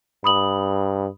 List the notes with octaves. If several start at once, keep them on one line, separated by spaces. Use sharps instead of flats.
G2 B5 D#6 F#7